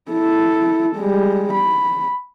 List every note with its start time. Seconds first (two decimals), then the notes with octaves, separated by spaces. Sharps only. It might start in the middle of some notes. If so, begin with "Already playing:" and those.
0.11 E4 A4
0.96 G3 G#3
1.54 B5